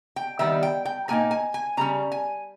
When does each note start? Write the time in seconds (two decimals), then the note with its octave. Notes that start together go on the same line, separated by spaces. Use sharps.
0.16 G5
0.39 D#3 G3 B3 E5
0.63 G5
0.85 G5
1.08 A#2 A#3 D#4 G#5
1.31 G#5
1.54 G#5
1.77 C#3 G3 C#4 A#5
2.12 G#5